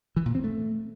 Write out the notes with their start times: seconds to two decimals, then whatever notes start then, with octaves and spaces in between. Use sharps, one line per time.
0.17 E3
0.26 A#2
0.35 C4
0.44 A3